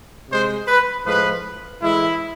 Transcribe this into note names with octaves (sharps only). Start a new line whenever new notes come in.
C3 G#3 C5
B4
A2 F3 G#3 B4
A2 E3 G#3 E4